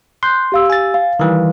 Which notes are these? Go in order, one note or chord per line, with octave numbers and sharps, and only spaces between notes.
C6 F#6 G6
G4 F5 E6
G#5 A6
F5
D#3 E3 G3